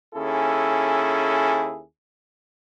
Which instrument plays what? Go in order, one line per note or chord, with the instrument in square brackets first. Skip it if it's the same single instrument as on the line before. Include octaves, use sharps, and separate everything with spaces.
[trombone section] D#2 C#4 E4 G#4 A4